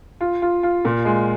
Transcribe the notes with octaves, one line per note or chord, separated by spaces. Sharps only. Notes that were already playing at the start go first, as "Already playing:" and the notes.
F4
F4
F4
A#2
G#3